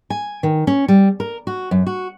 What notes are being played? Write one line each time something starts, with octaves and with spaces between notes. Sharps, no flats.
G#5
D#3
C#4
G3
A#4
F#4
F#2
F#4